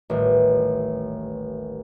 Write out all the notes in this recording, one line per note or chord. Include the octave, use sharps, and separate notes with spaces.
D#1 A1